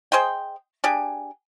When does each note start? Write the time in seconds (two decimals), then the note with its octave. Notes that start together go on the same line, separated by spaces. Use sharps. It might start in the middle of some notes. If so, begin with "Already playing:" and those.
0.12 G#4 C5 D#5 G5
0.84 D4 G4 G#4